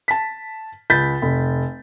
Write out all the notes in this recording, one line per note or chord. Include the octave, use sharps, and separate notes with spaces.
A5 B6
C#2 G6 A6 B6
F1